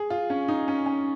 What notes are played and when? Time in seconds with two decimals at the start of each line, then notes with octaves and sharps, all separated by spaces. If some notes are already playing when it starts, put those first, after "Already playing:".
Already playing: G#4
0.10 F4
0.30 C#4
0.48 D#4
0.68 C#4
0.86 C#4